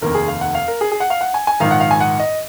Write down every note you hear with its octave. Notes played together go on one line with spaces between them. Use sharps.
F1 D#2 D#3 A#3 A#4
G#4
F5
F#5
F5
A#4
G#4
G#4
F#5
F5
F#5
G#5
G#5
A#1 G#2 D#3 F5
F#5
F5
G#5
F#5
D#5